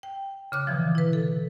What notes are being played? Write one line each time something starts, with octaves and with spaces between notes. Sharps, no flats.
G5
C#3 D6 F#6
B2 D3 E3 F3
E4 B4
A4